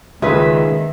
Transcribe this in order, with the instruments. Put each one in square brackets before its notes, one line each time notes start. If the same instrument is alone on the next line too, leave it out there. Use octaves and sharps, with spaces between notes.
[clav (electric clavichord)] C#2 [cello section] D#3 A#3 [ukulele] G#4 B4 [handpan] E5